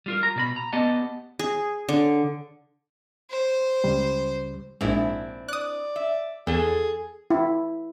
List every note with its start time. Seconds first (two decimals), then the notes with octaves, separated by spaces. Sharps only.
0.06 G3 F4 A#4
0.23 A#5
0.36 B2 D5 B5
0.56 A#5
0.73 B3 G4 D5 D#5 F#5 A5
1.39 G#4
1.89 D3
3.31 C5
3.84 C#2 C#3 G3
4.81 A#1 G#2 C4 D4 E4
5.48 D5 D#6 F#6
5.96 E5
6.47 E2 G#4 A4
7.30 E4